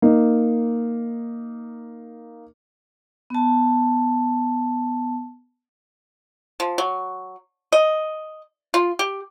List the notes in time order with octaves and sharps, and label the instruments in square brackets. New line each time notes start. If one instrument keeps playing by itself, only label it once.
[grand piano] A#3 D#4
[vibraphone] B3 A5
[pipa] F3
F#3
D#5
F4
G4